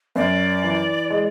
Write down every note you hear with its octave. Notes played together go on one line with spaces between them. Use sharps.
F#2 D5
E3
G#3